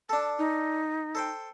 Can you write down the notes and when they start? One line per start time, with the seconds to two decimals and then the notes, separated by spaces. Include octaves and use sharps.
0.09 D4 A4 A5
0.39 D#4
1.15 A4 C5 G5